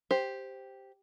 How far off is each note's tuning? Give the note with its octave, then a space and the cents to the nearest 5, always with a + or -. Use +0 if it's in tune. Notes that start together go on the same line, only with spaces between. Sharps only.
G4 +0 C5 +0